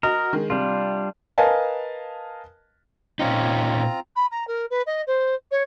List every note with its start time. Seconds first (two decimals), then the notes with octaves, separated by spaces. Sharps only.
0.03 F#4 A#4 D#5
0.33 D#3 G#3
0.50 C3 G3 D4 F4
1.38 A#4 B4 D#5 F5 G#5 A5
3.19 A#2 C4 C#4 D#4 F4 A#5
4.16 B5
4.31 A#5
4.47 A#4
4.70 B4
4.86 D#5
5.07 C5
5.51 C#5